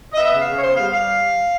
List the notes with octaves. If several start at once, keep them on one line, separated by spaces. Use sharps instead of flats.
D#5
B3 E5
C#3
F5
C#3
C#5
B3 C5
G3 F5
G3 F5